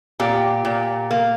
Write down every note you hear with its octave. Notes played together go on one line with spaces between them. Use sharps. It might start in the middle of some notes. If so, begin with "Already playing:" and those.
A#2 G4
A#2
A#3